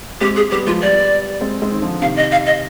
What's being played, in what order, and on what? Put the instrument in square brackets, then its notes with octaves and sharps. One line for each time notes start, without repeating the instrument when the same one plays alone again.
[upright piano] G#3 C4 [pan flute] G4
[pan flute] G#4
[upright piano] G3 B3 [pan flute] G4
[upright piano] F3 G#3 [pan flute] F4
[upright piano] G3 B3 [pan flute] D5
[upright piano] G#3 C4
G#3 C4
D#3
D3 F3
[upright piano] C3 D#3 [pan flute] F5
[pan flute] D#5
F5
D#5